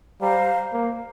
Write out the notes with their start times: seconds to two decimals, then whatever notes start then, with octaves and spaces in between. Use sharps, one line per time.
0.21 G3 C5 F5 A#5
0.73 A#3